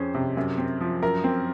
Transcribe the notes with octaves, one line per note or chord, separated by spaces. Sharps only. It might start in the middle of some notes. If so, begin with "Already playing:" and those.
Already playing: F2 C#4 G#4 C5
C3
F#2
C4
F3
F#2 A#4
C4